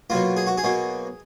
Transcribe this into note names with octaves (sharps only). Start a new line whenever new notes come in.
B2 F#3 A#3 F4
G#4
F#4
G#4
B2 F#3 A#3